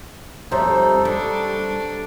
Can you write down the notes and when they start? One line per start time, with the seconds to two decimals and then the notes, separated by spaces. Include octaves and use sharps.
0.51 F2 G3 D#4 A4 C5 C#5 E5
1.05 G3 D4 A4 C#6